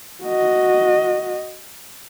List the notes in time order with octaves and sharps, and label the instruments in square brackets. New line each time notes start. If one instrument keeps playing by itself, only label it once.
[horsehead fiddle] F#4 D#5